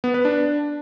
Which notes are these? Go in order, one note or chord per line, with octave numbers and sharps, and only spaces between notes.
B3
B4
D4